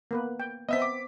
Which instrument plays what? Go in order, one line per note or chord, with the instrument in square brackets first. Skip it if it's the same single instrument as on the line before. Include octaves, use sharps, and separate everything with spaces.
[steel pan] A#3 B3 B4
G5
[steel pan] B3 C4 [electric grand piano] D#5 E5 B6
[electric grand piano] D6